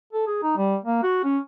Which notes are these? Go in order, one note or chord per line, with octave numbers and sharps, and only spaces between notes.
A4
G#4
D#4
G3
A#3
F#4
C#4